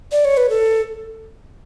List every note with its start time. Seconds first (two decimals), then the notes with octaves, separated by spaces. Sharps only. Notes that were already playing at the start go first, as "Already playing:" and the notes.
0.12 D5
0.25 C#5
0.37 B4
0.49 A4